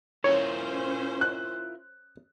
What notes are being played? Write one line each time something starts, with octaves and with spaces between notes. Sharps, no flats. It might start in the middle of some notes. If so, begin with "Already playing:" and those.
C#4 E4 F4 A#4 C5 C#5
F#6